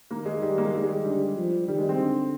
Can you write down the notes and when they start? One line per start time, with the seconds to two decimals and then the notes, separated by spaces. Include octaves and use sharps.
0.11 D#3 A#3
0.26 G#3
0.42 D#3 G3
0.58 A#3
0.66 G#3
0.73 D#3 G3
0.84 G#3
1.04 D3 G3
1.36 F3
1.68 D#3 G3
1.78 G#3
1.89 C4
1.99 D3